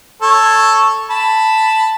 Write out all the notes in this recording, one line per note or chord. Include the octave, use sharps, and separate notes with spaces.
A4 C#5
A5 B5